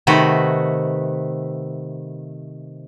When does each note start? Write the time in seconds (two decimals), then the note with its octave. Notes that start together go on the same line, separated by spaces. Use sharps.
0.07 C3 D#3 A3 F#4 B4